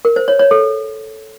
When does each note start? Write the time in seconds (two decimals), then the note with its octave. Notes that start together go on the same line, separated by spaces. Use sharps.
0.05 A#4
0.16 C5
0.28 C#5
0.39 C#5
0.51 A4